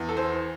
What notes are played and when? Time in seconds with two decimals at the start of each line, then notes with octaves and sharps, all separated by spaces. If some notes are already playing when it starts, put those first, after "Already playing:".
Already playing: E2
0.09 A4
0.17 E3 C5